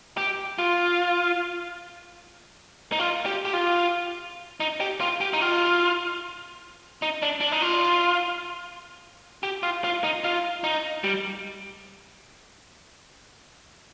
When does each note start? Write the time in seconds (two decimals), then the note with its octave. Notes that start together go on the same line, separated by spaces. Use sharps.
0.17 G4
0.58 F4
2.92 D#4
2.99 F4
3.26 G4
3.45 G4
3.53 F4
4.60 D#4
4.80 G4
5.00 F4
5.21 G4
5.33 D#4
5.41 F4
7.02 D#4
7.22 D4
7.40 D4
7.52 D#4
7.62 F4
9.43 G4
9.63 F4
9.84 F4
10.04 D#4
10.24 F4
10.64 D#4
11.04 G3